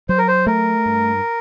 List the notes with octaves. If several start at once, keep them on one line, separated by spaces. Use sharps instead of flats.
F#3 C5
A#4
C5
A3 A#4
G2